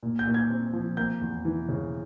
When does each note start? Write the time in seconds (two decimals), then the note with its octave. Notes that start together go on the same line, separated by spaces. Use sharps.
0.03 A#2
0.19 G6
0.27 A#2
0.34 G#6
0.50 C4
0.73 F3
0.97 A#3 G6
1.21 E2
1.45 E3
1.69 C#3